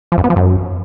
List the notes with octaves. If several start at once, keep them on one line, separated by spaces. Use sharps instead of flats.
F3
F#2
B3
F3
F#2